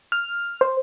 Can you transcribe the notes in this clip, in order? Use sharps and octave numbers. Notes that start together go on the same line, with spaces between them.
F6
C5